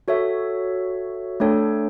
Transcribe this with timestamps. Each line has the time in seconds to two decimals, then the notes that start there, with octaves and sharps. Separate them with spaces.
0.08 F#4 A4 C#5 E5
1.40 A3 D4 A4 C#5 G5